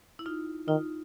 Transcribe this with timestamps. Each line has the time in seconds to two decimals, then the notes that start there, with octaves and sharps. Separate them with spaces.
0.19 E4
0.26 D#4 F4
0.67 D#3 D#4 F4